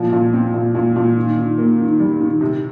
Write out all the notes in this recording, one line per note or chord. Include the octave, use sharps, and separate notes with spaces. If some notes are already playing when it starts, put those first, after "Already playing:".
Already playing: A#2 F3
A#2
C4
A#2
A#2
A#2
D#3
D#3
A#3
D#3
G3
D#3
C3